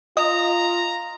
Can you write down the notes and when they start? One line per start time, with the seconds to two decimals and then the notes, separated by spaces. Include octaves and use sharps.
0.17 F4 D#5 A#5